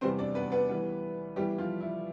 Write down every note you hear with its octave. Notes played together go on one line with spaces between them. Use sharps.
E2 C3 G3 B3 C4 C5
D4 D5
B3 B4
B3 B4
A2 E3 G3 B3
A2 E3 G3 B3 G4
F3 F4
E4